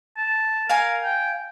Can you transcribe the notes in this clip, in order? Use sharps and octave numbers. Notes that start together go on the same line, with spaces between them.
A5
A#4 F5 G#5
G5